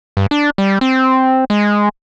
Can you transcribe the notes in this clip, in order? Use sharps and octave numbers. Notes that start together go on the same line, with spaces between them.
G2
D4
G3
C4
G#3